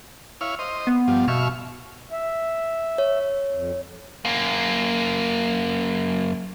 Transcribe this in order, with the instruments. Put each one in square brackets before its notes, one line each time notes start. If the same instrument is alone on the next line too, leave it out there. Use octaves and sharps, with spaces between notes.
[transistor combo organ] E4 C#5 F5
C5 D#5
[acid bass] B3
[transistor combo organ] G2 F3
[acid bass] B2 [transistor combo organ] E5 F5 C#6
[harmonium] E5
[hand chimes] C#5
[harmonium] F2
[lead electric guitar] F#2 A#3